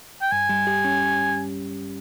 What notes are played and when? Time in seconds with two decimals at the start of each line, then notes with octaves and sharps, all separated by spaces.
0.22 G5
0.32 G2 G#5
0.49 G3
0.67 G4
0.85 C#4